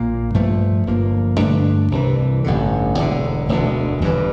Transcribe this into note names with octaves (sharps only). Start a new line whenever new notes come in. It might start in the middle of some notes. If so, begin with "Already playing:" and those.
Already playing: A#1 A#2 A#3
G2 F3 A3
G1 G2 F3 A#3
G2 D3 A3 D4
C2 C3 E3
A1 G2 D3
E1 E2 D3
E1 D2 D3
G1 G2 E3